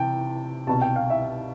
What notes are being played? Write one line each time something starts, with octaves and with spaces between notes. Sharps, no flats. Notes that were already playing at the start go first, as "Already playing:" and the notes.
Already playing: C3 E3 G5 A5
C2 B2 A5
G5
F5
E5